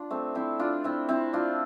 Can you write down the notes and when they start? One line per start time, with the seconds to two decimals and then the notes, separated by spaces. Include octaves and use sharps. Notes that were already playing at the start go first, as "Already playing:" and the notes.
Already playing: D4 F4
0.10 A3 C4
0.35 C4 E4
0.59 D4 F4
0.84 C4 E4
1.09 C4 E4
1.33 D4 F4